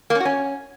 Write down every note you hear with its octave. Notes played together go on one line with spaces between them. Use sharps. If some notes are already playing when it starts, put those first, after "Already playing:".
A#3
C#4
F#4
C#4